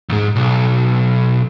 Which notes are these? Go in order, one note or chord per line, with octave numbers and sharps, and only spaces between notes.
D#2 G#2
B1